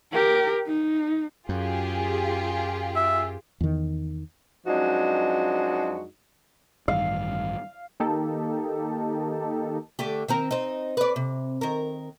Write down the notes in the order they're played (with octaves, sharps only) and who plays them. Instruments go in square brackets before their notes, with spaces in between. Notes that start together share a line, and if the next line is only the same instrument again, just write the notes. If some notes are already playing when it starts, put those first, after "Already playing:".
[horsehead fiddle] G4 A#4
D#4
[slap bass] F#2 [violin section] F4 G4 G#4
[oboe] E5
[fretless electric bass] E2 D#3
[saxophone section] F#2 F3 G#3 D4 D#4 F#4
[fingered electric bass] A1 G2 D#3 [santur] F5
[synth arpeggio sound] D#3 A#3 D#4 G4 A4
[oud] D3 A3 G4
D#3 C4 A#4
C4 D#4
B4 D5
C3
D#3 A#4